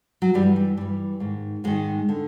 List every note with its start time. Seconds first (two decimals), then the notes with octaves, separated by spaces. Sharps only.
0.22 F#3
0.34 G2 E3 G3
0.56 G3
0.77 G2 E3 G3
1.20 G#2 D#3
1.64 G#2 D#3 G#3
2.09 D3